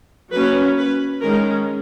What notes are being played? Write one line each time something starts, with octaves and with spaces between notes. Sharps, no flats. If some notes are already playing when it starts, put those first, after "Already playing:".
F#3 A#3 C#4 B4
B4
D#3 G#3 C#4 A#4